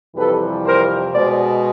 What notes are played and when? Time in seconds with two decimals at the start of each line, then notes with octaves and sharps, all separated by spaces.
0.15 F2 C3 E3 G3 A4 B4
0.64 A#4 C5
1.13 B2 G#3 C5 D5